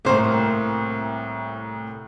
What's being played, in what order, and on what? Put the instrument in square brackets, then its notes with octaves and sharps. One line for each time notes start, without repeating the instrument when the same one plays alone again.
[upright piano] C2 A2 [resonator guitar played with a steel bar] A#3 C5